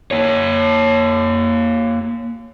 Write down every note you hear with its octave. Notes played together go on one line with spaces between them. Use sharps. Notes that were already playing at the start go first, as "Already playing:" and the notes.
A#3 C#5